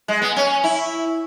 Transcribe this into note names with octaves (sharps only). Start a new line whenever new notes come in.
G#3
B3
C#4
E4